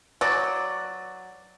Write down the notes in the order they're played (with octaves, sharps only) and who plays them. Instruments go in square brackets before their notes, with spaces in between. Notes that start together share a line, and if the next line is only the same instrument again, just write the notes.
[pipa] F#3 D5